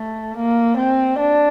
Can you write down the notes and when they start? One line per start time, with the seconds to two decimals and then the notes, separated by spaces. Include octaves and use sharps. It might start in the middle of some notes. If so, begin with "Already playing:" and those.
Already playing: A3
0.37 A#3
0.77 C4
1.19 D4